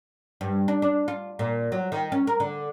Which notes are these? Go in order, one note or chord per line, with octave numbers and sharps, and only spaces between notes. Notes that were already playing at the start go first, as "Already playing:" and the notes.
G2
D4
D4
F4
A#2
F#3
D#3
C#4
A#4
D3